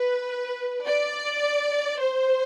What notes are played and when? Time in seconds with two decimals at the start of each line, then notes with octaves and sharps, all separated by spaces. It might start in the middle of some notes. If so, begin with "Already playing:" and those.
Already playing: B4
0.86 D5
1.99 C5